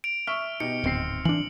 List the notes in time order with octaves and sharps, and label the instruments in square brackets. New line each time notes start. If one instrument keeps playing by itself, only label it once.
[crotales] D7 F7
[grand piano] E5 C#6 [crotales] F6
[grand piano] B2 D#4 G4 [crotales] C#7
[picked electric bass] D1 [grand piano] G#1 C4 C7
[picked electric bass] E3 D4 [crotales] F#7